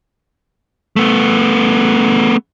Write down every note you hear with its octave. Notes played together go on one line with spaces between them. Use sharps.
A3 B3